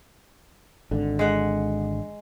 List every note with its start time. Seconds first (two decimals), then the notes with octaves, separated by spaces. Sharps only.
0.91 G#1 D3
1.19 G#3 F#5